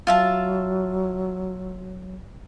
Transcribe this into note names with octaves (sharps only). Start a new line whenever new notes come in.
F#3 F4 E5 A5